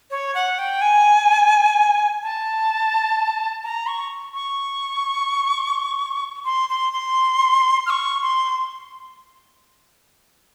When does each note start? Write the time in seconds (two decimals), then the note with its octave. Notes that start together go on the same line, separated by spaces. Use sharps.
0.10 C#5
0.35 F#5
0.59 G5
0.81 G#5
2.23 A5
3.64 A#5
3.87 C#6
4.34 C#6
6.45 C6
6.69 C6
6.93 C6
7.86 F6
7.90 C#6
8.22 C6